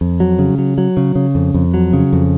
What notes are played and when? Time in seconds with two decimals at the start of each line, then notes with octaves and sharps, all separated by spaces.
0.01 F2
0.20 F#3
0.39 C#3
0.58 F#3
0.78 F#3
0.97 C#3
1.16 C#3
1.35 F2
1.54 F2
1.74 F#3
1.93 C#3
2.13 F2